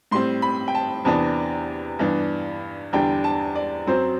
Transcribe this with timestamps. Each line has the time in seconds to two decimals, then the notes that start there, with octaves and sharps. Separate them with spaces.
0.11 A2 G3 C4 C6
0.42 B5
0.68 G5
0.75 A5
1.05 E2 C3 E3 B3 D4 A5
1.99 G2 E3 B3 D4
2.93 E2 D3 G3 D4 G5
3.24 A5
3.55 D5
3.87 F#2 F#3 C4 C5